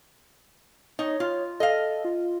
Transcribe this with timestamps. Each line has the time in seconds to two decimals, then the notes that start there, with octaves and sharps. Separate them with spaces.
0.99 D#4 C#5
1.20 F4
1.60 A4 D#5 F5
2.05 F4